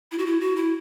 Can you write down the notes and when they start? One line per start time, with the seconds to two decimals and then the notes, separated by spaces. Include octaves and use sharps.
0.12 E4
0.18 F#4
0.26 E4
0.40 F#4
0.56 E4